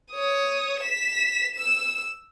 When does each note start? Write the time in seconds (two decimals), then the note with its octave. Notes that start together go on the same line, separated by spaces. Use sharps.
0.12 C#5 D#6
0.80 B6 E7
1.55 E6 E7